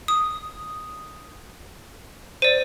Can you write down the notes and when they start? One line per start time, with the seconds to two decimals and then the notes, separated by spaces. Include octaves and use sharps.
0.08 D#6
2.42 C5 D5 D#7